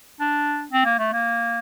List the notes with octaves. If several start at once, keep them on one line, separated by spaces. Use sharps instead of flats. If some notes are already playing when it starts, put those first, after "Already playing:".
D4
C4
A#3
A3
A#3